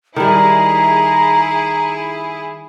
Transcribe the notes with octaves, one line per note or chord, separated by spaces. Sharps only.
D#3 G3 E4 G#4 A#5